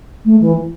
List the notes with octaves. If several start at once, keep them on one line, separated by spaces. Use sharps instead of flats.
A3
E3